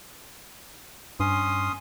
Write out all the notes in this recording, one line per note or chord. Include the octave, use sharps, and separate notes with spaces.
G2 C#4 C6 D#6